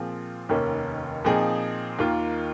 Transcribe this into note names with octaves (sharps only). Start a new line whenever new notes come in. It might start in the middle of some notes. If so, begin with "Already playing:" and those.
Already playing: A#2 F3 C4 F4 G#4
F1 D#2 D#3 A#3 C#4
A#2 F3 C4 D#4 G#4
D#2 D#3 A#3 F4